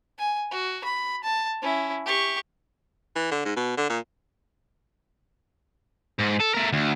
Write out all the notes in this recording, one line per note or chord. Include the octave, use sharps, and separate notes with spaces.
G#5
F#4
B5
A5
C#4 E4
G4 C#6
E3
D3
G#2
B2
D3
A#2
G#2
A4
A3 A#4
D2